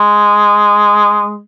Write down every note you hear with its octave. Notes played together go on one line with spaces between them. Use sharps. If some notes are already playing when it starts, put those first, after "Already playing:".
Already playing: G#3